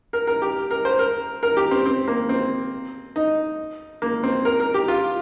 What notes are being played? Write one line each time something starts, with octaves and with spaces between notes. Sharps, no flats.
A#4
A#4
G4
A#4
C5
A#4
A#4
G4
C4
C4
A#3
C4
D#4
A#3
C4
A#4
A#4
G4
F4